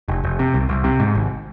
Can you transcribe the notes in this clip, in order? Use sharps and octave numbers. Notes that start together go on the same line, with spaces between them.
F1
F1
C3
C2
C2
C3
G#2
G#1